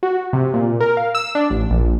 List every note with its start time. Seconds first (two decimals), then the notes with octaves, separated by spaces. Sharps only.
0.03 F#4
0.33 C3
0.54 A#2
0.80 A#4
0.97 F5
1.15 E6
1.35 D4
1.50 A1
1.70 A#1